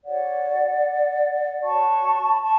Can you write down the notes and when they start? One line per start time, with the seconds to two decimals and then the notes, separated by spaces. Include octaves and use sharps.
0.04 F#4 C#5 D5 F#5
1.62 F#4 C#5 A5 C#6
2.32 B5
2.41 A5 C#6